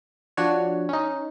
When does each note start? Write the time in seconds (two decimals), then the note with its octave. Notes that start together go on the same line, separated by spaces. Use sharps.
0.37 F3 D4 F#4 C#5
0.89 C#4 D#4